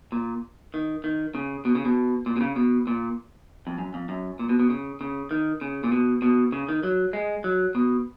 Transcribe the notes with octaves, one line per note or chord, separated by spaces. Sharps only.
A#2
D#3
D#3
C#3
B2
C#3
B2
A#2
B2
C#3
B2
A#2
F2
F#2
F2
F#2
A#2
B2
B2
C#3
C#3
D#3
C#3
A#2
B2
B2
C#3
D#3
F#3
G#3
F#3
B2